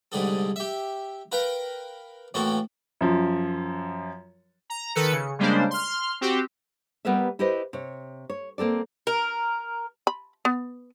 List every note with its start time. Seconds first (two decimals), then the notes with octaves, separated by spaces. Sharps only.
0.12 C2 G#2 D3 G#4 A4
0.56 G4 E5
1.32 A#4 B4 F5 G5 A#5
2.34 A2 E3 A#3 C4 F#4 A4
3.01 F#2 F3
4.70 A#5
4.95 D#3 A4 B4 C#7
5.12 C#3
5.39 C#3 G3 G#3 A#3 D4 C5
5.71 C6 F6
6.21 C4 F#4 G4
7.05 G3 B3 G4 A#4 B4 E5
7.39 E4 G4 B4 C5 D#5
7.73 C3 C#5
8.30 C#5
8.58 A#3 C4 A4 D5
9.07 A#4
10.07 B5
10.45 B3